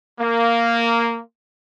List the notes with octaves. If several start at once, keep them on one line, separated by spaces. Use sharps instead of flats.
A#3